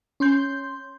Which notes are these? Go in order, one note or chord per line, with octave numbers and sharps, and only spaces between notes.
C#4 C6 G6